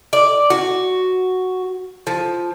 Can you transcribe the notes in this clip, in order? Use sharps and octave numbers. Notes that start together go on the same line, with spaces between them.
D5
F#4
F3